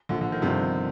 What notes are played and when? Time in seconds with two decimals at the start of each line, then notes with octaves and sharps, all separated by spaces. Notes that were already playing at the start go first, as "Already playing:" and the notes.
0.09 A#1 A#2 D3 F3
0.21 D3
0.32 D#3
0.42 G1 G2 C3 F3 C4